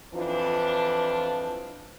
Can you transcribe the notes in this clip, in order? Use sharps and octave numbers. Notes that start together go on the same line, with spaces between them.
F2 E3 F3 D4